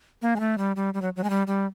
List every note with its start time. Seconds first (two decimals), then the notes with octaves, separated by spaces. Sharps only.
0.22 A#3
0.36 G#3
0.40 A3
0.58 G3
0.76 G3
0.94 G3
1.02 F#3
1.16 F#3
1.24 G#3
1.30 G3
1.47 G3